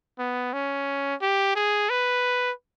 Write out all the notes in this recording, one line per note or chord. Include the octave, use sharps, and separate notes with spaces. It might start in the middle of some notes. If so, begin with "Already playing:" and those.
B3
C#4
G4
G#4
B4